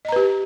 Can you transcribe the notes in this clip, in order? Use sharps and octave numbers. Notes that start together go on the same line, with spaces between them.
G4 B4 D#5 A#5